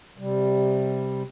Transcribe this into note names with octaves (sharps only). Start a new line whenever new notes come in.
C3 G3